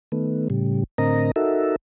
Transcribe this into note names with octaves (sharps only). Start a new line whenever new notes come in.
D#3 A3 B3
A2 C#3 G3
A2 D3 C4 A#4 D#5 A#5
D#4 F#4 A4 A#4 E5